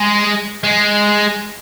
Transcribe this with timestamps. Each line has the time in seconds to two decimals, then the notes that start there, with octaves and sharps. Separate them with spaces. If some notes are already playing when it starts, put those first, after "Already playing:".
Already playing: G#3
0.63 G#3